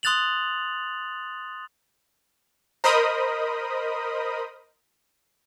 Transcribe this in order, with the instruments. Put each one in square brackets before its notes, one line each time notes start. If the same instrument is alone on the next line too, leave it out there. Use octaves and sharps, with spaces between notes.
[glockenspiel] C6 D#6 F#6 A6 F7 F#7
[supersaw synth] A#4 C5 D#5 B5 D#6